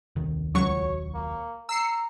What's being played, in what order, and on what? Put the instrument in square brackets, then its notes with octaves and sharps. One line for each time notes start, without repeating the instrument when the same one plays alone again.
[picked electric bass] D#1 C2 D#3
[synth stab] C#2 F#3 C#6 [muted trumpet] C#5
[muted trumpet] A#3
[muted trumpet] A#5 [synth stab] E6 C7 C#7